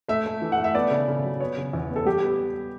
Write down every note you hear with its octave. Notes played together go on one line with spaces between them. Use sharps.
A3 E5
A3
E3
F#5
A3
E5
B3 D5
C#3
C#3
F#3
B3 C#5
C#3
E2
B3
A4
G3 G4
B3